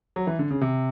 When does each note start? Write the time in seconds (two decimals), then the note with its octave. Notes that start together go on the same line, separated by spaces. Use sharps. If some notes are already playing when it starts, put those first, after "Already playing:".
0.16 F#3
0.27 E3
0.39 D3
0.51 C#3
0.61 C3